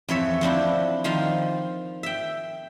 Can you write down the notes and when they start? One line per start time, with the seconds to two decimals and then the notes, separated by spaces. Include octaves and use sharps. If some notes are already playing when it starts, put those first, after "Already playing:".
0.08 F2 E3 C#5 E5
0.41 F3 C4 D4 E4
1.04 D#3 F3 F4 F5
2.03 E5 G5